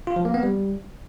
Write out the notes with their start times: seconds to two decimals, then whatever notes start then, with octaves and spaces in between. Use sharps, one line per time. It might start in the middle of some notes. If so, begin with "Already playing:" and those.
0.07 F4
0.16 F3
0.25 A#3
0.34 B3
0.43 G3